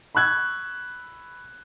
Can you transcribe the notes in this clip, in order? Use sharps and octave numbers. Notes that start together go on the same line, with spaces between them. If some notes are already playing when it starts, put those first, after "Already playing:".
B5 C#6 E6 F#6 G#6